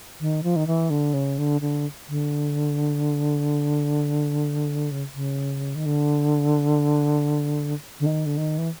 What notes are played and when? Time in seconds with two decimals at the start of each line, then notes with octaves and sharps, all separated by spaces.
0.20 D#3
0.43 F3
0.56 D#3
0.67 E3
0.90 D3
1.14 C#3
1.38 D3
1.61 D3
2.09 D3
4.91 C#3
5.15 C#3
5.75 D#3
5.86 D3
8.00 D3
8.06 D#3
8.26 D3
8.37 D#3
8.58 E3